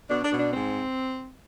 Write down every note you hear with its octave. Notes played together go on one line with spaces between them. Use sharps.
B2 D4
D4
B2
D4
G#2 C4